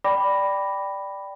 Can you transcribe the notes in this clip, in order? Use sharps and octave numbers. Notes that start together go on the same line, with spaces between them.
D5 G5 B5 D6 A#6